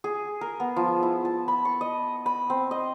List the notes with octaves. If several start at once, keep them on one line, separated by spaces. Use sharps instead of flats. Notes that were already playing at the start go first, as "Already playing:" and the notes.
G#4
A#4
B3
F3
E4
A5
B5
C#6
D#5
B5
C4
D#5